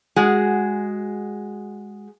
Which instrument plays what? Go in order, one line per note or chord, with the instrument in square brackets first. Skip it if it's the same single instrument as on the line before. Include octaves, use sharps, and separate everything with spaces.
[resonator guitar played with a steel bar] G#3 F#4 G#4